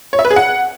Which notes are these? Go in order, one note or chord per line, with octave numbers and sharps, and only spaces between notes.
C#5
E5
B4
G#4
F#5